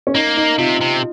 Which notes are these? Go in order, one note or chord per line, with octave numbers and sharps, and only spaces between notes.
C#4
A#3 D#4
D#4
C3 F4
C3